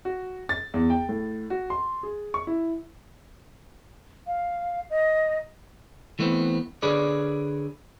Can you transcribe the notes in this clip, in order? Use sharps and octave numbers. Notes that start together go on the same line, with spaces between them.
F#4
A6
E2
G5
A2
F#4
C6
G#4
C#6
E4
F5
D#5
E3 A3 B3 C4
D3 G#4 B4 C#5 D5